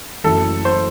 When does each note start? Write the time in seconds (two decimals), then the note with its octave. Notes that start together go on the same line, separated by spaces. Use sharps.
0.24 F#1 F#2 E3 A3 E4 A4
0.65 C5